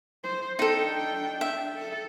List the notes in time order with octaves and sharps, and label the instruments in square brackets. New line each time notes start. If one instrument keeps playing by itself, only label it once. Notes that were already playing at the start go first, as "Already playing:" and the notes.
[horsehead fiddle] C5
[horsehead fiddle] D4 G5 [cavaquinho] D#4 A4
[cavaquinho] E5
[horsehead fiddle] A4